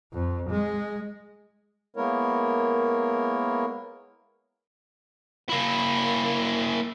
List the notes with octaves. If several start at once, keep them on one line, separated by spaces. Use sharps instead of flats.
F2
G#3
G#3 A#3 B3 E4 A#4 C#5
A#3 E4